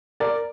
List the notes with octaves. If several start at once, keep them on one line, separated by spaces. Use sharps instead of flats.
A#4 D5